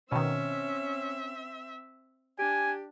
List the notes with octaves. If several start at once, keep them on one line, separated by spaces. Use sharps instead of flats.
B2 D#3 C4 C#4 E5
D4 G4 G#5